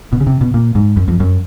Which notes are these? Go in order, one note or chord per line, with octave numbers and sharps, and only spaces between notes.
B2
C#3
C3
B2
A#2
G#2
F#2
F2
F#2